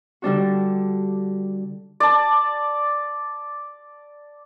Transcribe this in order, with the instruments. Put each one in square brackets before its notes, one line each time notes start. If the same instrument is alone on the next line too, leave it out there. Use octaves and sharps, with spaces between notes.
[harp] D3 G3 D4 F#4
[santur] D5 A5